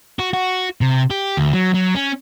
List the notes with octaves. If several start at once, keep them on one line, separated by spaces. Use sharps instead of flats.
F#4
F#4
C3
G4
D2
F#3
F#3
C#4